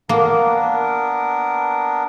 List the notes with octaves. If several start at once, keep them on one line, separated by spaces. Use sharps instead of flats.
A#3 B3 D4 A#4